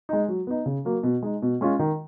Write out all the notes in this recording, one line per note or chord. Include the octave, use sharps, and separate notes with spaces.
G#3 D#4
F#3
B3 D#4
C#3
F#3 A#3
B2
G#3 D#4
B2
G#3 C#4 F4
D#3